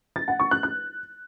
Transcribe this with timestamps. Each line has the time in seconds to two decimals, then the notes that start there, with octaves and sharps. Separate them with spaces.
0.16 A6
0.28 F#5
0.40 C#6
0.51 F#6
0.63 F#6